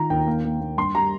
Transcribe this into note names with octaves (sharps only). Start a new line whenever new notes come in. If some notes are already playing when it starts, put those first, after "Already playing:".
Already playing: D#3 F4 A#5
D#2 G5
A#3
A#3
A#3
G2 C6
G3 A#5